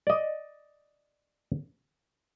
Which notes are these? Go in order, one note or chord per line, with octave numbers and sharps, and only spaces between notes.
D5 D#5